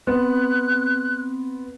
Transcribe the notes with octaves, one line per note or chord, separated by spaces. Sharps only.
B3 C4 F#6